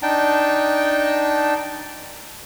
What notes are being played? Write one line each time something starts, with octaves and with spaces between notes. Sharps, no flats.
D4 D#4 G5 A5